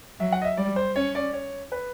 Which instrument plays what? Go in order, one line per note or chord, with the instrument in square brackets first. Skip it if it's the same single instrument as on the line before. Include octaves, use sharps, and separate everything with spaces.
[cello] F#3 [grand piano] E5
[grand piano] F#5
D#5
E5
[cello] G3 [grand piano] D5
[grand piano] C5
[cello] C#4 [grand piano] C#5
[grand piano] D5
C#5
B4